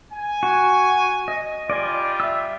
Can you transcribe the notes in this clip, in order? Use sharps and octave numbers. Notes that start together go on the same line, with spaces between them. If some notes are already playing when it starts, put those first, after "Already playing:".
G#5
F#4
D#5
G3 F4 D5 D#5 G#5
E5 E6